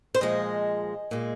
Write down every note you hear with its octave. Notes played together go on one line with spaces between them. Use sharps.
C5
A#2 F3 G#3 D#5
A#2 G#3